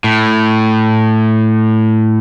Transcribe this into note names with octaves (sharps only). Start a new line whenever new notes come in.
A2